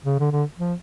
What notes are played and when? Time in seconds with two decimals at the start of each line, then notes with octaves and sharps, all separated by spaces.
0.06 C#3
0.19 D3
0.32 D3
0.58 F3